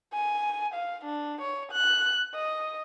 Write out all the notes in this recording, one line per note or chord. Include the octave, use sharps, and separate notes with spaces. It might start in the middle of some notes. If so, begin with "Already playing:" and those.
G#5
F5
D4
C#5
F#6
D#5